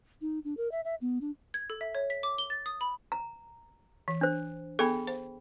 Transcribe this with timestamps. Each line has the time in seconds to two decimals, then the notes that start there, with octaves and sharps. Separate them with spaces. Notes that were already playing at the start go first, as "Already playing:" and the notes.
0.22 D#4
0.45 D4
0.57 A#4
0.72 E5
0.85 E5
1.01 B3
1.21 D4
1.54 G#6
1.70 A4
1.81 E5
1.95 C#5
2.10 B6
2.23 D6
2.38 G7
2.50 A6
2.66 D#6
2.81 B5
3.12 A#5
4.08 E3
4.21 D4 C5
4.79 B3 G#4 A4 G5 B5
5.07 C5